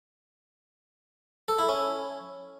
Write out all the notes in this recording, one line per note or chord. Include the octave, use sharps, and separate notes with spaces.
A4
E4
C#4